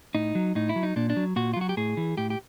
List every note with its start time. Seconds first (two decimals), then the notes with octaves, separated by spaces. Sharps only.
0.15 A2 D#4
0.35 F#3
0.55 A2 D#4
0.69 E4
0.76 F#3
0.83 D#4
0.96 A#2 D4
1.10 D4
1.17 F#3
1.36 A#2 F#4
1.54 F4
1.56 F#3 F#4
1.69 G4
1.77 A2 G#4
1.97 E3
2.18 A2 G4
2.30 G4